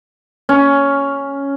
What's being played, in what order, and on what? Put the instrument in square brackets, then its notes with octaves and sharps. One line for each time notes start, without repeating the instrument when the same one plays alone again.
[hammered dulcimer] C#4